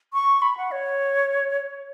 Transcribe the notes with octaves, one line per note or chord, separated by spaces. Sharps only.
C#6
B5
F#5
C#5